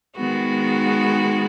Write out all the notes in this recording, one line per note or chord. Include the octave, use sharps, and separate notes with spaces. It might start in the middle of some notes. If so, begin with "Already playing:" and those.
D#3 G#3 B3 F#4